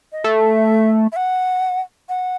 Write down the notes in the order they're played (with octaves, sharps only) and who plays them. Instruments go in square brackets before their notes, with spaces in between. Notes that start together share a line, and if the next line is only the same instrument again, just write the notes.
[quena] D#5
[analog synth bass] A3 [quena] E5
[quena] E5
F#5
F#5